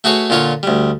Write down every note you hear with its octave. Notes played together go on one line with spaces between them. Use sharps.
A3 F#4 G#4 B4 C#5
A#2 D3 F4 C#5
D2 G3